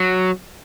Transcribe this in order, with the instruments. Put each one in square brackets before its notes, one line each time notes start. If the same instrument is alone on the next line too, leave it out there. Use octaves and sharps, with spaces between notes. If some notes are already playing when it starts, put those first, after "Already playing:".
Already playing: [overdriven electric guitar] F#3